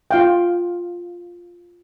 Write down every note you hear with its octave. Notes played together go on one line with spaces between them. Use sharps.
F4 F5 G5